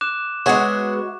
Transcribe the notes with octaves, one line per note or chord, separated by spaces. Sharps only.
D6 F#6 E7
G#3 B3 F#4 G#4 C#5 E5 F#5 C#6